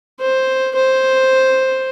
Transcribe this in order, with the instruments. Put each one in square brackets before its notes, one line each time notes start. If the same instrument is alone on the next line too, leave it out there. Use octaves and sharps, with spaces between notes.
[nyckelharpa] C5
C5